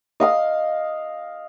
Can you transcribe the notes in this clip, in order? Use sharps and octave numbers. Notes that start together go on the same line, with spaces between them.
D#5 F5 D#6